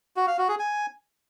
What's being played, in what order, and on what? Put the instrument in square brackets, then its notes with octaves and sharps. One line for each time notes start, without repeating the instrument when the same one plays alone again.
[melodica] F#4
F5
F#4
G#4
G#5